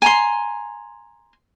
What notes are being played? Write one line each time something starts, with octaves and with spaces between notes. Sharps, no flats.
G#5 A#5 C6